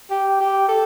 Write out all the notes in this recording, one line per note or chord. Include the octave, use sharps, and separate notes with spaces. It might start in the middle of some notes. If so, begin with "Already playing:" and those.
G4
G4
A4